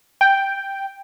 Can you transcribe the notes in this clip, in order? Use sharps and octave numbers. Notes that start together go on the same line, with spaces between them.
G5